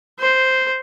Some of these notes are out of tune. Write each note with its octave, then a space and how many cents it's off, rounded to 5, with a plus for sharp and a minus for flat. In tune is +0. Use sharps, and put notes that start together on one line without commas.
C5 -5